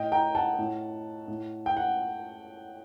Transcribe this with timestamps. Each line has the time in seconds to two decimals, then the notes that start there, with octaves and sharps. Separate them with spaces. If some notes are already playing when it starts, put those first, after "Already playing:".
Already playing: A2 D#5 G5
0.12 G5 A#5
0.35 F#5 A5
0.59 A2
1.28 A2
1.66 G5
1.77 F#5